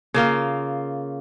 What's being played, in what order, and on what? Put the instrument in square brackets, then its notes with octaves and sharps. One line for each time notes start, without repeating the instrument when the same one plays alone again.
[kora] C#3 A#3 F4